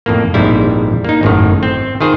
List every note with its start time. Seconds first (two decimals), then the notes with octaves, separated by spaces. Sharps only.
0.06 F2 A2 A#3
0.34 A#1 F2 G#2 G3 E4
1.05 A#3 D#4
1.23 G#1 F#2 A2 D#3
1.63 C4
2.01 D#3 F4 G#4 C5